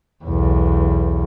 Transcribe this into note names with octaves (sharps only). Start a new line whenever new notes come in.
B1 E2